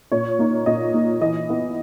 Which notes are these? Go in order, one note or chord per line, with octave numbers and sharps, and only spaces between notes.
A#2 C#5
A#3 D#4
A#2 D#5
A#3 D#4
E3 D#5
B3 E4